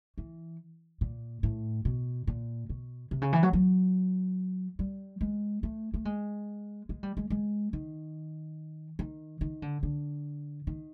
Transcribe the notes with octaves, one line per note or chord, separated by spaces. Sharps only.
E3
A#2
A2
B2
A#2
B2
C3
C#3
E3
F#3
F#3
G3
G#3
A3
A3
G#3
G#3
G3
G#3
G#3
D#3
D#3
D#3
D3
D3
D#3